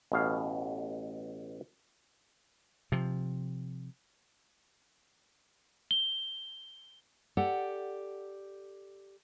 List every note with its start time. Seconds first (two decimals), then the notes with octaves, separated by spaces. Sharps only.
0.12 A1 B2 F5
2.92 C3 F3
5.91 G7
7.37 G4 A4 D5 F#5